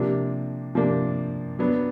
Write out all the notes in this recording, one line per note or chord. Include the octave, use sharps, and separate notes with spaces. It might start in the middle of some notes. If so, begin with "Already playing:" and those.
Already playing: C3 F3 A#3 D4
C3 F3 A#3 D4
F#3 B3 D4